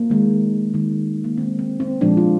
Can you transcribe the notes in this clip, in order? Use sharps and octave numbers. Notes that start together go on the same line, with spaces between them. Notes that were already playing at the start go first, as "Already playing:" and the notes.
Already playing: A#3
D#3 G#3
D#3 G#3
A#3
D#3 G#3 C4
C4
C4
A#2 F3 G#3 D4
F4